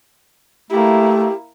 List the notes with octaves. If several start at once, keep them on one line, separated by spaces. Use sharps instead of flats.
A3 A#3 E4 G4